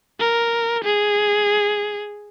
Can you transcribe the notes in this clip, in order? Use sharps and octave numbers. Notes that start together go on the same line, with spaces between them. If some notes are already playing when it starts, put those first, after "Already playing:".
A#4
G#4